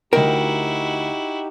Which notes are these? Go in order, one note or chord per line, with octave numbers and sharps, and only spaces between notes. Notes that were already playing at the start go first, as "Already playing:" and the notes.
D2 D#4 E4 F#4 G4 A#4 D#5 G5